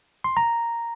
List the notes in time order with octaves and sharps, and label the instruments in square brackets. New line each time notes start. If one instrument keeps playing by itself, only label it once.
[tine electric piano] C6
A#5